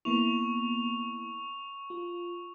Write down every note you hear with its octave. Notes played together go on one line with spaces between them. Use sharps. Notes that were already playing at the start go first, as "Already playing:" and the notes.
A#3 B3 E4 C#6 F7
F4